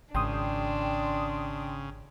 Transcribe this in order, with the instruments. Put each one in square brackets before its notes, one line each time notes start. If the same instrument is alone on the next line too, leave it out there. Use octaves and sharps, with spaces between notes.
[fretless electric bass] G#1 [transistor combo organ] C#3 [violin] D4 [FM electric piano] G5 C6 D#6